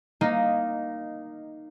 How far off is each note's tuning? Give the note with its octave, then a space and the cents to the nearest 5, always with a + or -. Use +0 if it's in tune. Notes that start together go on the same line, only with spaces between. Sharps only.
A#3 +0 D#4 -10 D#5 +0